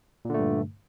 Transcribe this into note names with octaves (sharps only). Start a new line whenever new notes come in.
G2 A#2 D3 A3